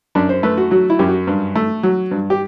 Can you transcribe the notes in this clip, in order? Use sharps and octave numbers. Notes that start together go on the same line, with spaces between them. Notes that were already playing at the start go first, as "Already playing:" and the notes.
F#2 D4
C5
A3 B4
F#4
F#3 F#4
E4
F#2 G4
F#4
G2
A3
F#3
G2
G4